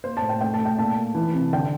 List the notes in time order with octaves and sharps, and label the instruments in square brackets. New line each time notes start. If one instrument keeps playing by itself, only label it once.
[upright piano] A#3 C5
A5
A2
G5
A3 G5
A5
A3
G5
A#2 A5
A#2
E3
C3
D3 G5